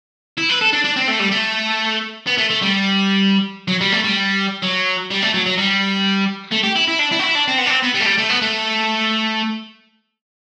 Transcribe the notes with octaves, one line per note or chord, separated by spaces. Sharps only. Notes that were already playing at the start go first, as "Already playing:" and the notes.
E4
B4
A4
D4
D4
C4
A3
G3
A3
B3
A3
A3
G3
F#3
G3
A3
G3
F#3
G3
A3
F#3
F#3
G3
A3
G4
E4
E4
D4
E4
F#4
E4
D4
C4
B3
D4
C4
B3
G3
A3
G3
A3
B3
A3